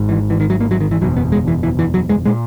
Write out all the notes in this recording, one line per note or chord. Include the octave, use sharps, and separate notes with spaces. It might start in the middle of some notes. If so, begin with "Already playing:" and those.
Already playing: G#1 G#2
E3
E3
D#3
F#3
A#3
F#3
D#3
E3
F#1 E2 B2 F#3
B3
G#3
E3
E3
E3
F#3
G#3
A#2 G#3